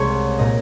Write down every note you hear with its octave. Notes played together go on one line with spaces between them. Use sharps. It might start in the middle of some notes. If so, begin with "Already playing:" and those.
Already playing: C2 G#3 C#5
A#2 D#5